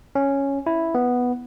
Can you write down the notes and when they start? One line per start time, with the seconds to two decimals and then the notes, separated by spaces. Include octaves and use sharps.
0.15 C#4
0.66 E4
0.95 B3